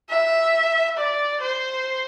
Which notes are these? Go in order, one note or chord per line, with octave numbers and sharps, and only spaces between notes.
E5
D5
C5